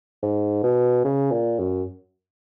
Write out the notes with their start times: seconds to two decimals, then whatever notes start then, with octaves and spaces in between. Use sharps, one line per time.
0.23 G#2
0.63 B2
1.05 C#3
1.31 A#2
1.59 F#2